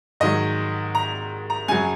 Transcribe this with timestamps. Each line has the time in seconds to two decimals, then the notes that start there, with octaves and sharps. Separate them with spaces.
0.20 G#2 D#3 F#3 D#5
0.95 A#5
1.50 A#5
1.68 F#2 C#3 F#3 G#5